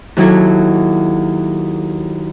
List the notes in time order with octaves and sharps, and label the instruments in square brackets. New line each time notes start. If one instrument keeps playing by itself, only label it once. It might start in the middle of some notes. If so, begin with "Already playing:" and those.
[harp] D#2 F#3 E4 A4